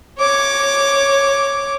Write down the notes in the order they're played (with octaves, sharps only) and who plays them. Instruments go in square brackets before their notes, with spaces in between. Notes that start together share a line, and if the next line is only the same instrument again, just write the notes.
[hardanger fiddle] C#5 D6